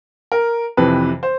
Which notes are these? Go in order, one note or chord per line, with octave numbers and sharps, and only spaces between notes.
A#4
F2 C3 E3 B4
C5